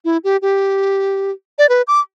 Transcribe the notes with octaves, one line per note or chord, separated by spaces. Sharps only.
E4
G4
G4
D5
B4
D6